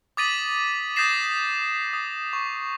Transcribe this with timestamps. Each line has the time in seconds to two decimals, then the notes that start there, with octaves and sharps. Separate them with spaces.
0.17 D6 D#6 A6 B6 D#7 F#7
0.96 D#6 G6 A6 A#6 C7 E7
1.93 D#6
2.33 C#6